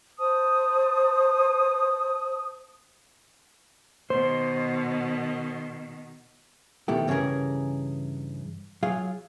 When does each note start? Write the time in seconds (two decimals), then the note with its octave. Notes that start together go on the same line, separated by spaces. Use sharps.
0.19 C5 A5 D#6
4.10 B2 D#3 C5
6.88 B2 D#3 A3 E4 G4
7.08 G2 C#3 E3 C#4 G#4 A#4
8.83 F#3 F4 G#4 F5